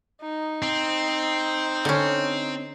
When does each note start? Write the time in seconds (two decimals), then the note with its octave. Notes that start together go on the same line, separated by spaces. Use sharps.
0.22 D#4
0.62 C4
1.85 D3 C#4